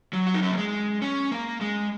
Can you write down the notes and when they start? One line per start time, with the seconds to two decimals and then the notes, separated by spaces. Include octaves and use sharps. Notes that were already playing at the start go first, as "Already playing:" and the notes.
0.13 F#3
0.27 F#4
0.34 D#4
0.42 C#4
0.50 A#3
0.58 G#3
1.02 C#4
1.32 A#3
1.61 G#3